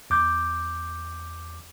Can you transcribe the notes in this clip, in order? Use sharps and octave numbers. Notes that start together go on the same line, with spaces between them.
E2 D6 G6